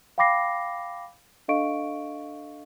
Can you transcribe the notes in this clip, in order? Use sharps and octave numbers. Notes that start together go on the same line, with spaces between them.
F5 G5 B5 D6 A#6 C7
D4 A4 D#5 F5 C#6 D7